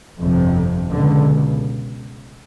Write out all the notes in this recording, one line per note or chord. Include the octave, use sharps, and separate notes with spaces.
G1 F2 C3
C#2 B2 D3